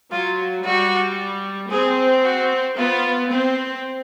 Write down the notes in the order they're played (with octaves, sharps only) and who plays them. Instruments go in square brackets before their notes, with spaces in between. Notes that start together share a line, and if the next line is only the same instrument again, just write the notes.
[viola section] F#3 [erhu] F4
[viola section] G3 [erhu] F#4
[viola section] C4 [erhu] G#4
[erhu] F#4
[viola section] B3 [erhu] F4
[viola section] C4